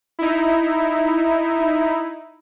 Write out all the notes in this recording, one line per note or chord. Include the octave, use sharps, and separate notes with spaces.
D#4 E4